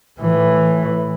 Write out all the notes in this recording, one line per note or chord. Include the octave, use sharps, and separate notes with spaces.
A2 E3